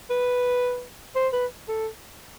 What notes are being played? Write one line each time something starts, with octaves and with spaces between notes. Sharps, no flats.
B4
C5
B4
A4